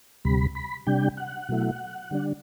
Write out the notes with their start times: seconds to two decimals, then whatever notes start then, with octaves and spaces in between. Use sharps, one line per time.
0.25 D2 C3 G3 B5
0.55 B5
0.87 C3 G3 D4 G5
1.17 F#5
1.49 B2 F#3 A3 E4
2.11 D3 G3 D4